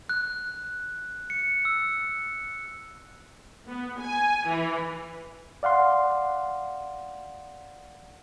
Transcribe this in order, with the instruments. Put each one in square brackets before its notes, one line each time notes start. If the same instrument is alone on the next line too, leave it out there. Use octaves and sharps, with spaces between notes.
[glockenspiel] F#6
C#7
E6
[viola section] B3
G#5
E3
[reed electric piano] D5 F5 F#5 C6